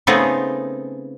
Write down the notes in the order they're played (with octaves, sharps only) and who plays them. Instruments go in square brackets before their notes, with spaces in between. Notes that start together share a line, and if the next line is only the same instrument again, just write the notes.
[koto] C#3 A3 B3 C4 D#4 G#4